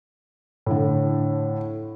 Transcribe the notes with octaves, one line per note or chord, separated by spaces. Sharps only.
A2 D3